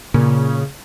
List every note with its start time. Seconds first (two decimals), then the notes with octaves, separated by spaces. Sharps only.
0.14 A#2 C#3